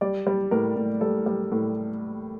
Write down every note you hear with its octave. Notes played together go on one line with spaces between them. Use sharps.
G3 D5
G3
A2 A#4
A2
G3 A4
G3
A2